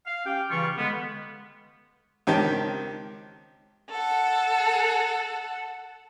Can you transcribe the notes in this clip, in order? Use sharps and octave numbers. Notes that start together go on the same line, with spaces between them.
F5
C#4 G4 F5 G5
C#3 E3 G3 F4 C#6
D3 G#3 B3
C#2 D#3 C4 G4 A5
A4 F#5